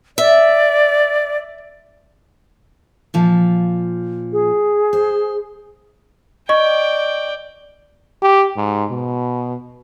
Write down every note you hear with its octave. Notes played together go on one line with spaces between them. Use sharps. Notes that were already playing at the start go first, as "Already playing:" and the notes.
D5 E5
A#2 F3
G#4
C5
D5 D#5 G5 C#6
G4
G#2
B2